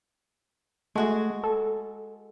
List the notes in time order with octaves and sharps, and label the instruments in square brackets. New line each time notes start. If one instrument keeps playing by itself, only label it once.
[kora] G#3 F#4 G#4 [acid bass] A3
[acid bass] A4